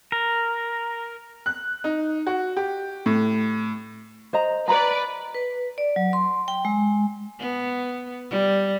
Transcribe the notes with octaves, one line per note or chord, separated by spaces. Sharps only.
A#4
F#6
D#4
F#4
G4
A2
C5 D#5 A#5
B4 D5 A#5 B5 D7
B4
D5
F#3
C6
G5
G#3
B3
G3